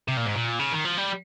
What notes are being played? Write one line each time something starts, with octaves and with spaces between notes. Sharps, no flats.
C3
A#2
G#2
A#2
C#3
D#3
F3
G3